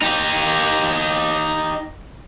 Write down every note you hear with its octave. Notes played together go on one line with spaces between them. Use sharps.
D#4 G4